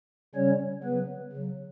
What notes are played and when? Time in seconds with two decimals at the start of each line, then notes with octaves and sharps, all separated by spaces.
0.35 C#3 G3 C#4 C#5
0.84 C#3 F#3 B3 B4
1.33 C#3 F#3